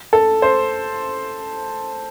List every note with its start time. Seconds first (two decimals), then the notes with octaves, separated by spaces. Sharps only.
0.13 A4
0.42 C5